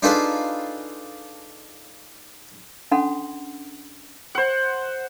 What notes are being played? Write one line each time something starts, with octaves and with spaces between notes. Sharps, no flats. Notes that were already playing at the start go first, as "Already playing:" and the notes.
D4 D#4 F4 G#4 A4 B4
C#4 D4 A4 F#5 B5 C6
C5 F#5